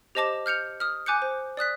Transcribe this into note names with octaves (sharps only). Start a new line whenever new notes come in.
G4 C5 D#5 A5 D6 E7
F6 G6 C#7 F7
D#6 F6
G#5 D6 F#6 G6 C#7
C5
D5 D#6 F#6 B6